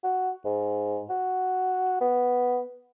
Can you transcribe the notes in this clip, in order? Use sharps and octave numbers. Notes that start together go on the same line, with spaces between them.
F#4
G#2
F#4
B3